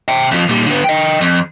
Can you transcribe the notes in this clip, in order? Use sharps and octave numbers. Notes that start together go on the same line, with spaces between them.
E5 G5
F2 F3
A#2 G3
D3 B3
D#5 G5
F2